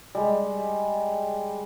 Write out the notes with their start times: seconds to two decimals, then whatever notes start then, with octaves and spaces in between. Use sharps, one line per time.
0.15 G3 G#3